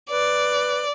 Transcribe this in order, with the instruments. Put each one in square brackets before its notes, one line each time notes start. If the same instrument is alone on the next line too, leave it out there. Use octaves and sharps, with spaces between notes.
[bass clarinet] B4 [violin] D5